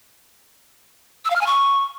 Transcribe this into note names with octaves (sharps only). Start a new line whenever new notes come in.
E6
F5
F6
G#5
C#6